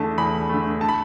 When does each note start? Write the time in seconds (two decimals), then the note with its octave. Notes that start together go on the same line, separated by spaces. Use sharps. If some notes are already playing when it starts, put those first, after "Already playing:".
Already playing: E2 D3 A3 A5
0.18 E2 B5
0.49 D3 A3
0.81 A5
0.89 B5